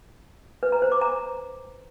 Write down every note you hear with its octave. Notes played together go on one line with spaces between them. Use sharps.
B4
A#5
C5
D6
A#5